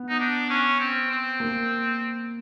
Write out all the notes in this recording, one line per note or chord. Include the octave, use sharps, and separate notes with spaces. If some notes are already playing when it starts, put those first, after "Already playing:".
Already playing: B3
D#4
D4
C#4
C4
C4
A#3